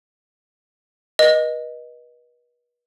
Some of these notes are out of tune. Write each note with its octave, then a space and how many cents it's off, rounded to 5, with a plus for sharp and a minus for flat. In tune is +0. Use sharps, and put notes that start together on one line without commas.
B4 -40 D#5 -5